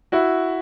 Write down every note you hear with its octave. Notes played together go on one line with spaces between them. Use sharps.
E4 F#4